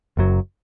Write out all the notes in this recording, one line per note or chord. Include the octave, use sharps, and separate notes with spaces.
F#1 F#2 F#3